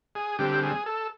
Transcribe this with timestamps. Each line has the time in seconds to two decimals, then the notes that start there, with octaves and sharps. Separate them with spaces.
0.15 G#4
0.39 D3 G3 C4 G4
0.63 G#4
0.86 A4